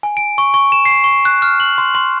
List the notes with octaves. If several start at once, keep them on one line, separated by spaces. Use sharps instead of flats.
G#5
D7
C#6
C#6
E7
C7
C#6
F#6
F6
F#7
C6
C6